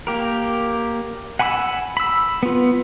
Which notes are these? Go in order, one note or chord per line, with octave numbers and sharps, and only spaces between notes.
A#3 G4 A#4
F#5 G#5 B5 C#6 E6
B5 E6
B3 F4